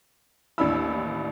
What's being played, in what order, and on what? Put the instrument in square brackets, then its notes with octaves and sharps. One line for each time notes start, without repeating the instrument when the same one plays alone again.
[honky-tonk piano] A1 D#2 D4 E4 B5 E6